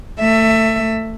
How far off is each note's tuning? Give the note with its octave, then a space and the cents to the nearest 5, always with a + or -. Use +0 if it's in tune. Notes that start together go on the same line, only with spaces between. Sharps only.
A3 +25 E5 +10